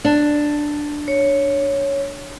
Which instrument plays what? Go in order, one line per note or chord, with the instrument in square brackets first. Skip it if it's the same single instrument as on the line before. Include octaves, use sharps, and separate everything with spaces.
[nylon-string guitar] D4
[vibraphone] C#5